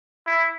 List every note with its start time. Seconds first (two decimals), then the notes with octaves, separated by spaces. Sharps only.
0.27 E4